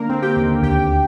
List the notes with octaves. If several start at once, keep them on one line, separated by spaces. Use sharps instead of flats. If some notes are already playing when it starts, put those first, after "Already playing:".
Already playing: D3 A#3 A#4
C4
G4 G5
D#2
D2 G4 G5